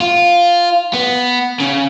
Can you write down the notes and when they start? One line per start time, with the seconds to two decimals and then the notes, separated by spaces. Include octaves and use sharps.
0.01 F4
0.94 B3
1.60 C#3